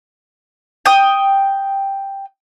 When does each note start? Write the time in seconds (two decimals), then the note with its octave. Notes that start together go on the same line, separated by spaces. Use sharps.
0.86 G5 D#6